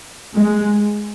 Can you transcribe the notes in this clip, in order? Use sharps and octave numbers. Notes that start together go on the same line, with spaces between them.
G#3